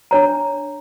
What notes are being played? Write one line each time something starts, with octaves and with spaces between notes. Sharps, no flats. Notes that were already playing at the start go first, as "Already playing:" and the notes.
D4 C#5 A#5